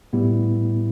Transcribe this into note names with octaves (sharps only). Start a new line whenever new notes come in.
A2 G3 B3 E4 G4